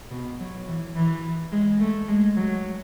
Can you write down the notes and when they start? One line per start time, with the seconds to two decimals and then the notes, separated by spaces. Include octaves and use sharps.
0.11 B2
0.39 F#3
0.67 E3
0.96 E3
1.52 G#3
1.80 A3
2.08 G#3
2.36 F#3